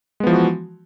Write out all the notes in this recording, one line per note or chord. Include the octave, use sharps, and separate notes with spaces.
E3 F3 G#3 B3 F#4